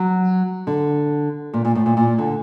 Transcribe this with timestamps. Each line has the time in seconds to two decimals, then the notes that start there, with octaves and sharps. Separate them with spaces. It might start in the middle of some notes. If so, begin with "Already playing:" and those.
Already playing: F#3
0.67 D3
1.54 A#2
1.65 A#2
1.75 A2
1.86 A#2
1.97 A#2
2.18 D3